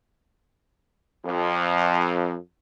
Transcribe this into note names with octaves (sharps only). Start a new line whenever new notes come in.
F2